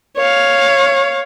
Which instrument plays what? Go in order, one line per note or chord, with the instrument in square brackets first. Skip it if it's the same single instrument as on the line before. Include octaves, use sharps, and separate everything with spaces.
[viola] C#5 F5